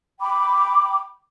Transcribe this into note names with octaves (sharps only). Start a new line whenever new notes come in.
G5 B5 D6